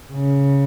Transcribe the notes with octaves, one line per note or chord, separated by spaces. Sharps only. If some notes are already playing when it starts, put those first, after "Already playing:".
C#3